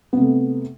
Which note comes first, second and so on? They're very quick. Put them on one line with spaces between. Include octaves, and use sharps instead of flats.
B3 C3 A3